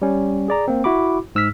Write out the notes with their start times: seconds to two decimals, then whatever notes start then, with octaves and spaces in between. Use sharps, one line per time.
0.02 G3 C#4
0.48 G#4 D5 A#5
0.68 A#3 C4
0.84 E4 F#4 B5 D6
1.35 G#2 E6 F6 B6